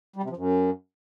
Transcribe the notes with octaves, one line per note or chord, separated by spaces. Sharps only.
G3
C3
F3
F#2